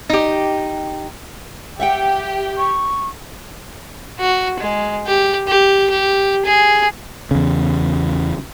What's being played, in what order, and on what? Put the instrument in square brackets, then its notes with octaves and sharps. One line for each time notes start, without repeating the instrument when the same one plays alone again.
[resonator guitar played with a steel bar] D#4 G4
[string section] G4 [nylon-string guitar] E5 F#5 G5
[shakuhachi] C#6
[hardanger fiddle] F#4
G#3
G4
G4
G4
G#4
[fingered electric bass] E2 C#3